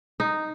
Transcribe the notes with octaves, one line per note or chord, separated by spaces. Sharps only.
D#4